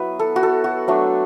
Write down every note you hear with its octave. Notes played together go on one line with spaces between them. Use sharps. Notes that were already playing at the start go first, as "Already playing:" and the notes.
Already playing: F#3 B3 E4 B4
A4
F#4
A4
F#4
F#3 A3 D4